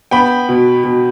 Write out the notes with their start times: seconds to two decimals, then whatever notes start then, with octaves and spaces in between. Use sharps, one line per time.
0.11 B3 G5 B5
0.49 B2
0.84 B2